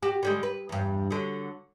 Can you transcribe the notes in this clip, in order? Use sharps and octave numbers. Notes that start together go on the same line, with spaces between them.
F#4 G4
D3 G3 G#3
B4
E2 G2
D3 F#3